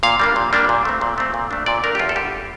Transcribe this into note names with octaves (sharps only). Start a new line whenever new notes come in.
A#2 F5
G3 A#3 D4
A#2
G3 A#3 D4
A#2
A3 C4
A#2
A3 C4
A#2
A3 D4
A#2 D5
A3 D4 A#4
G4
E2 F4
A4
D3 G3 G4